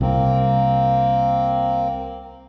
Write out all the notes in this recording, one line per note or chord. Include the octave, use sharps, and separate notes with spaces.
C2 A#3 C4